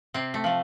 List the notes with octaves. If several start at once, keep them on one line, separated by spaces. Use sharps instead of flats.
C3 C4
A3
F3 A3